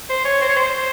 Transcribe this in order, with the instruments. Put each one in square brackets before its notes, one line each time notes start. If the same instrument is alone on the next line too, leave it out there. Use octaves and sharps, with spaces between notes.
[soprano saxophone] C5
C#5
C5
C#5
C5